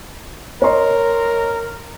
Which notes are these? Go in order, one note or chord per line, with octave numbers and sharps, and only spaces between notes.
A#4 C#5 D#5 C6